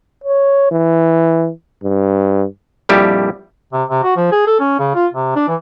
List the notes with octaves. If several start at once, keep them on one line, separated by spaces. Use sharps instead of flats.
C#5
E3
G2
A#1 F2 G3 E4 G4
C3
C3
F#4
F3
G#4
A4
C#4
C#3
F4
C3
D4
E3